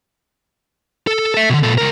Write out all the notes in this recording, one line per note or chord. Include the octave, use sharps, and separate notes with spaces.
A4
A4 E5
B2 D3
A#2 A4
C#2 A#4